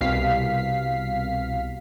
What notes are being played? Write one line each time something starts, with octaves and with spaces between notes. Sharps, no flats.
C2 B2 F5 B6 C7